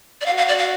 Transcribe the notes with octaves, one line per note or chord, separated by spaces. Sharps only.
D5
F#4 F5
F5
D5
F5